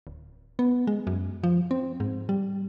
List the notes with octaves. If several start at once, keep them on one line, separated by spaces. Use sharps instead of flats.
D1
B3
G#3
F#2
F3
C4
G#2
G3